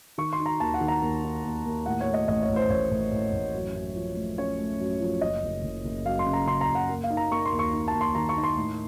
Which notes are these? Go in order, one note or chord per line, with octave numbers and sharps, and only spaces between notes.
D#3 C#6
C6
D#4
A#5
D#2 A5
F#5
D#3
A#5
D#2
D#4
D#2
D#2
A2 F#5
C#5
A3
D#5
A1 D#5
C#5
A1
C5
A1 C#5
A1
A1
A1
F#2
F#2
F3
A3
C#4 C#5
A3
F#2
F3
F#1 D#5
F#1
F#1
F#1
F#2 F5
C6
C#3
A#5
C#3 C6
A#5
F#1
F#5
A#3
F5
D#4
A#5
A#3 C#6
C6
D#2
C#6
D#4
A5
D#2
C6
D#3 A#5
C#6
D#4
C6
A2